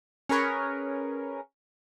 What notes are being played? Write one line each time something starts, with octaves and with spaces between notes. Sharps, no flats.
C#4 G#4 A#4 B4 C#5